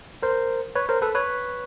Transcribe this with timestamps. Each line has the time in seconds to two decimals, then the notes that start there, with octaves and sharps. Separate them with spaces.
0.23 A#4 C5
0.75 B4 C#5
0.89 A#4 C5
1.02 A4 B4
1.15 B4 C#5